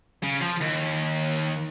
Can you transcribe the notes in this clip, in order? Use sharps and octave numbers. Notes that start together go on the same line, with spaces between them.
C#3
F3
D#2